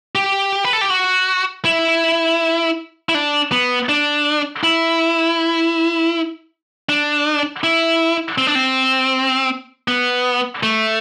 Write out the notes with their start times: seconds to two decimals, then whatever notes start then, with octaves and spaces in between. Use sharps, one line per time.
0.15 G4
0.65 B4
0.73 A4
0.81 G4
0.90 F#4
1.65 E4
3.09 E4
3.15 D4
3.52 B3
3.89 D4
4.63 E4
6.89 D4
7.64 E4
8.38 C4
8.47 D4
8.55 C4
9.88 B3
10.63 A3